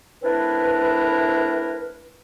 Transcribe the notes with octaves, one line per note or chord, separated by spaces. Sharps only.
A3 C4 D4 E4 A#4 B4